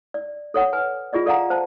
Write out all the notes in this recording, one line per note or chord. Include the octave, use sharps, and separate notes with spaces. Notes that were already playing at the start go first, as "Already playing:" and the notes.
D5
A4 C#5 F#5
B4 G#5
F4 G#4 D5 D#5
A4 D5 F5 F#5 A#5
C5 A5